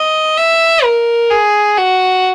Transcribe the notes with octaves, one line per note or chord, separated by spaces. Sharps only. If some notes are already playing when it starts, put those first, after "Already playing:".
Already playing: D#5
E5
A#4
G#4
F#4